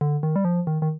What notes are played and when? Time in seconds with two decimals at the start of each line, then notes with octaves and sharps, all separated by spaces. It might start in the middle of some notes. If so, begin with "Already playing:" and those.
0.01 D3
0.23 D#3
0.36 G3
0.45 F3
0.67 D#3
0.82 D#3